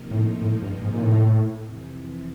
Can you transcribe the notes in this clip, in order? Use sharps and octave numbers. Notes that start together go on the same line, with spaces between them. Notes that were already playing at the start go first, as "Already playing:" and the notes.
Already playing: C3 F3 A#3 D#4
A2
A2
G2
G#2
A#2
A2
F2 C3 E3